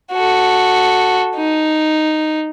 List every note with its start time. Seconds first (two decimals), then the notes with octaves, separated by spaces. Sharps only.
0.12 F#4 A4
1.36 D#4